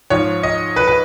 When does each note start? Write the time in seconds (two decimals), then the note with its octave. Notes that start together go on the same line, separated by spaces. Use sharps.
0.10 G#2 F3 C#5
0.43 D#5
0.76 B4
0.88 B4